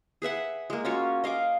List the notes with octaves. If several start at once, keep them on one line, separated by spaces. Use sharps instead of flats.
G#4 B4 E5 F#5
G#3 A#3
C#4 F4 F#4 C#5
D#5 F5 G#5 D6